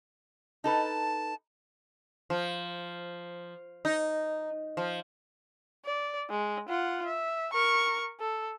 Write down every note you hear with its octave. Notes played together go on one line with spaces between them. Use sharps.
D#4 A4 B4 A5
F3
D#4
F3
D5
G#3
F4 F#5
E5
A#4 C#6
A4